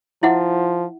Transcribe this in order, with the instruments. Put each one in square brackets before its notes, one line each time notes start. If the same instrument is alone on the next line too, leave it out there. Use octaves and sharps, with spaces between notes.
[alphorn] F3 [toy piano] E4 E5 F#5